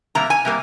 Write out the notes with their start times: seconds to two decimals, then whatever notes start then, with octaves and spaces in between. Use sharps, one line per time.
0.15 C3 G3 A#3 A#5
0.30 G#5
0.45 C3 G3 A#3